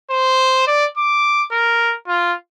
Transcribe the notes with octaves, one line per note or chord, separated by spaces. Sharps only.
C5
D5
D6
A#4
F4